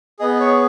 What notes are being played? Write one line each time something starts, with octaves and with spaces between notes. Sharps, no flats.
B3 G#4 D#5
C#5